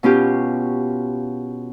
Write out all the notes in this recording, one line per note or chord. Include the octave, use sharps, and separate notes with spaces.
B2 C#4 F4 G4